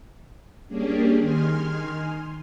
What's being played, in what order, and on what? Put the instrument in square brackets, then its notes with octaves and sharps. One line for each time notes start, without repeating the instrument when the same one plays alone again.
[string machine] G3 A#3 C#4 D4 G4 G#4
D#3 G#5 C6 F6